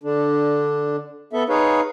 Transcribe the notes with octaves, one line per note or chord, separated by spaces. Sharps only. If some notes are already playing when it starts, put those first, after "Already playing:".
D3 D4
B3 A4 E5
D#4 G#4 B4 C#5 F5